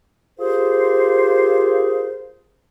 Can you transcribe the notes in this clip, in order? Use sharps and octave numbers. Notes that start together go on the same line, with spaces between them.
F4 G4 G#4 A#4 C5